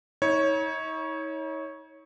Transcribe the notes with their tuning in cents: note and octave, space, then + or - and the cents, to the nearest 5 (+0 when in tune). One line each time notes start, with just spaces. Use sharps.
D#4 +45 C#5 +0